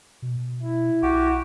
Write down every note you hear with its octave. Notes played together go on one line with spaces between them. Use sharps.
B2
E4
B1 F#4 G4